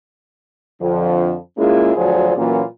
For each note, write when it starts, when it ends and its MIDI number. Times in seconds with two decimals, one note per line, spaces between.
0.81 1.33 41
0.81 1.33 50
0.81 1.33 53
1.58 1.95 56
1.58 1.95 58
1.58 1.95 61
1.58 1.95 64
1.58 1.95 65
1.58 1.95 68
1.96 2.35 38
1.96 2.35 53
1.96 2.35 54
1.96 2.35 68
1.96 2.35 72
1.96 2.35 74
2.36 2.62 46
2.36 2.62 52
2.36 2.62 54
2.36 2.62 58
2.36 2.62 61
2.36 2.62 65